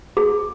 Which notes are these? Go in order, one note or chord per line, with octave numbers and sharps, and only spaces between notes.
G#4